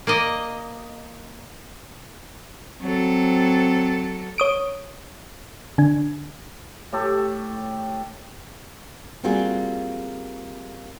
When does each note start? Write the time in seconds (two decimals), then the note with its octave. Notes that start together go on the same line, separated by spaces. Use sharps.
0.07 A#3 D5 D#5
2.82 F#3 C4 A4
4.38 C#5 D#6 D7
5.78 D3 D4
6.93 A2 G4 A4 C#6
9.23 G3 A#3 C4 F4 F#4 G#4